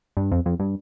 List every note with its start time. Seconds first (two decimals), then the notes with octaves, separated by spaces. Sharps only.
0.17 G2
0.31 F2
0.46 F2
0.60 G2